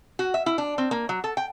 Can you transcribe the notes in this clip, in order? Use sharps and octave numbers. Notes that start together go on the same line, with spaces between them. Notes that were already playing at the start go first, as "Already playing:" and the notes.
F#4
E5
E4
D4
C4
A#3
F#3
A4
G5